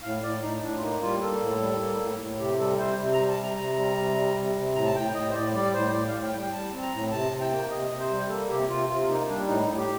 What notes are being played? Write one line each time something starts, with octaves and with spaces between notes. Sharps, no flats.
A2 F5
A2 D5
A2 D#4
D#4
A2 D4
F4
A#3 D#4
G3 F4
A#3 A4
A2
G3
A#3
A2
A2
C3 G4
G3 A4
C3 C5
C3
A#5
G3
A5
C3
A#5
C3
G3
C3
G3
C3
C3
A2 A#5
A5
A2 G5
A2 D#5
C5
A2 D5
G3 D5
A2 C5
A2 D5
F5
A2
G5
G3
G5
G3 A5
C4
A#5
A2
C3 A5
C3
G5
A#3
C3 D#5
C3
C5
G3
A#3 A4
C3 G4
C3 F4
C3 F4
F4
A#3 D#4
G3 D4
A2 D#4
A2
G4